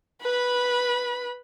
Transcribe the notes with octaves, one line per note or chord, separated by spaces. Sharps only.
B4 B5